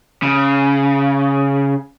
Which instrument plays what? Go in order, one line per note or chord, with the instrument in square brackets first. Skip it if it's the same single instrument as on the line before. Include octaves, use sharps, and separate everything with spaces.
[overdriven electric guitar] C#3